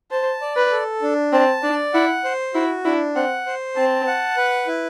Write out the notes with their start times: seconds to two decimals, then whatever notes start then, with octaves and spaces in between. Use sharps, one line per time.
0.11 C5 A5
0.41 D5
0.56 B4
0.71 A4
1.02 D4
1.32 C4 A5
1.63 D4 D5
1.94 E4 F#5
2.24 C5
2.54 E4 F#4
2.85 D4 E4
3.15 C4 F#5
3.46 C5
3.76 C4 A5
4.07 F#5
4.37 B4
4.67 E4